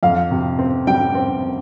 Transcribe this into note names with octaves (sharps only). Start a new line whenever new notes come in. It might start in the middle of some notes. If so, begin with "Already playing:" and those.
F2 F5
C3
C4
G3 G5
C4